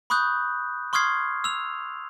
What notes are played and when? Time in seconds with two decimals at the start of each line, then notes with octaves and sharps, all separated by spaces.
0.10 B5 C#6 D#6 F#6 G6
0.93 C6 C#6 D#6 F6 G#6 C7
1.44 E6 F7